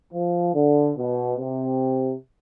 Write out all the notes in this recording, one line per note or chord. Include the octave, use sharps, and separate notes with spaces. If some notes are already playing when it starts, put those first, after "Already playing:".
F3
D3
B2
C3